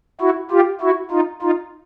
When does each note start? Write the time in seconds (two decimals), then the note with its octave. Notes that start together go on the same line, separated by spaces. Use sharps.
0.21 E4 F#4
0.51 F4 G4
0.81 E4 F#4
1.11 D#4 F4
1.42 D#4 F4